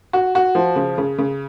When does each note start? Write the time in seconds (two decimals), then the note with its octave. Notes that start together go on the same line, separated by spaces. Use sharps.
0.13 F#4
0.35 F#4
0.55 F3
0.76 C#3
0.98 C#3
1.18 C#3